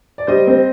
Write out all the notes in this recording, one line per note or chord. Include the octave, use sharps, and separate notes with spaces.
D5
G3 C5 D#5
C4